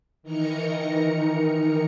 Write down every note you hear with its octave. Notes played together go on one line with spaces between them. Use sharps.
D#3 E3 D#4 A#4 A#5 C#7